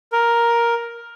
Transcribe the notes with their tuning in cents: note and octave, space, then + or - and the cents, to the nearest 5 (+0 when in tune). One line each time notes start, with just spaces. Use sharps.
A#4 +5